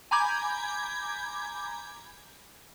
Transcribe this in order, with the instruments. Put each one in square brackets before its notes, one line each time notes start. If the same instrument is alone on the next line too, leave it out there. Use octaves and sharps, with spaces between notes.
[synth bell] G#5 A#5 B5 D6 G6 G#6